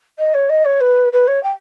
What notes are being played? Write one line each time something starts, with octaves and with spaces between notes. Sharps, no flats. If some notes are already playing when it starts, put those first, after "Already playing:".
D#5
C#5
D#5
C#5
B4
B4
C#5
G5